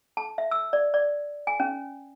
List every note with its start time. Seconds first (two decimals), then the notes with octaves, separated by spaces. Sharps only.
0.17 A5
0.38 E5
0.51 E6
0.73 D5
0.94 D5
1.47 G#5
1.60 C#4